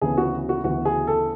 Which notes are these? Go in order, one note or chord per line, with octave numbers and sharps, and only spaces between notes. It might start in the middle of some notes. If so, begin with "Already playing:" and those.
D2 C#3 E3 B3 G#4
F#4
F#4
D2 C#3 E3 B3 F#4
G#4
A4